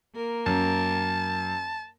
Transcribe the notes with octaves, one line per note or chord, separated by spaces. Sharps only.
A#3 A#4
F#2 A5